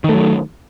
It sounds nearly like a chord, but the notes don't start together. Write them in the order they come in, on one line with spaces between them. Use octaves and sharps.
D#3 A3 F#3